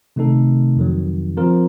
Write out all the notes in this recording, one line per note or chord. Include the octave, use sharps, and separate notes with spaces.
C3 D#3 A3 D#4 A4
F2 D#3 F#3
F3 C4 F4 A#4